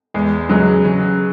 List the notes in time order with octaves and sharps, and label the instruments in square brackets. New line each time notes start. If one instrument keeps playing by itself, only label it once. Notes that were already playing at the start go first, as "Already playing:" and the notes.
[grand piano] E2 [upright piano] G#3
[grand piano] C#3 G#3 [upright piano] F#3
[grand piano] C#3